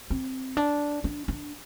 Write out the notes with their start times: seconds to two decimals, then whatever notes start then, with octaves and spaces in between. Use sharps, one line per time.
0.10 C4
0.57 D4
1.04 D4
1.28 D4